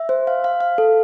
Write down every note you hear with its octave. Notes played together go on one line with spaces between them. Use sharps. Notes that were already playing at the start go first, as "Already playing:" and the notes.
Already playing: E5
C5
F5
F5
F5
A4